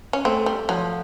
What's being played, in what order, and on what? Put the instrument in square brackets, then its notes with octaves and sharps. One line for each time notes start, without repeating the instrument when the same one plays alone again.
[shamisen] C#4
[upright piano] A3 [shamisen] C4
[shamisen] G3
[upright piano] F3 [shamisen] F#3